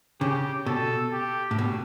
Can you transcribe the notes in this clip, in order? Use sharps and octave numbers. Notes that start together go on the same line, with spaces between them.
C#3 G4
B2 A4
G4
A2
B2